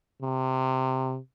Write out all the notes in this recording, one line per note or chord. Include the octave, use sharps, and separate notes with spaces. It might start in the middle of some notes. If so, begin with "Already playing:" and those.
C3